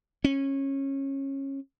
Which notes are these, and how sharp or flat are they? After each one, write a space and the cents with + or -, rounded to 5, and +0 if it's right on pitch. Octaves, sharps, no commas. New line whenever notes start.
C#4 -20